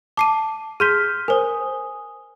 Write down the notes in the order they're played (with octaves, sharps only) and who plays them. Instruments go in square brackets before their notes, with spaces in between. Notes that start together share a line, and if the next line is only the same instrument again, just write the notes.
[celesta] A5 [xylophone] D6 C7 D#7
[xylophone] G#4 C6 G7 [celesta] F6 G6 B6
[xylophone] A#4 C5 [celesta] G#5 D#6